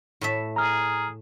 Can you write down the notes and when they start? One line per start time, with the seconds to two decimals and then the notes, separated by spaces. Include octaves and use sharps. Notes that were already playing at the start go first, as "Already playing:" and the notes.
0.21 A2 A4 E5
0.56 G#4 A#5 F6